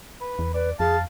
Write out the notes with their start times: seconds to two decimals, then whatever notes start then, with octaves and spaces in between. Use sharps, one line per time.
0.21 B4
0.39 E2
0.54 B4 D5
0.80 F2 G#4 F5 A5